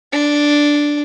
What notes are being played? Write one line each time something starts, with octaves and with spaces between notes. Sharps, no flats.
D4